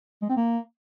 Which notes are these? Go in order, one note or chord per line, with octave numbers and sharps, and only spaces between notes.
G#3
C4
A#3